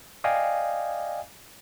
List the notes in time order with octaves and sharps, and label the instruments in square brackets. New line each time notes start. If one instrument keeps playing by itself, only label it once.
[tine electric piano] D5 D#5 F5 G5 G#5